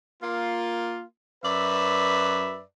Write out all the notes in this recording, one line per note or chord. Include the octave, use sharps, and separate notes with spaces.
A#3 F4
F#2 B4 D5 E5